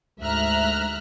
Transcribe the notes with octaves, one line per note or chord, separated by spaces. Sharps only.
D2 G#2 E5 A#5 F6 F#6